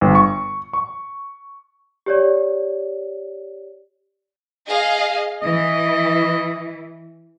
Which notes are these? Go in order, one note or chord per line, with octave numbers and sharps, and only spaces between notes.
G1
C#6
C#6
G4 C#5 D5
G#4 D#5 F5
E3 D#5